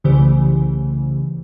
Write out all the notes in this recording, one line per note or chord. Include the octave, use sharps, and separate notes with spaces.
C2 C#3 E3 A3 G4 C5